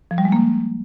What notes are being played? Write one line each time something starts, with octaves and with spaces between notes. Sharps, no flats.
F3
G3
G#3
A#3